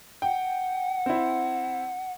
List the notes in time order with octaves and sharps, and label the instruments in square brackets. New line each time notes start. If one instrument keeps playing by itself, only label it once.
[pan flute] F#5 [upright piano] G5
[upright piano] C4 E4